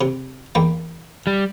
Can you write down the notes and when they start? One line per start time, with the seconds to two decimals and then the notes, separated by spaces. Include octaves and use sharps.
0.01 C3
0.55 E2 A#3 G5
1.27 G3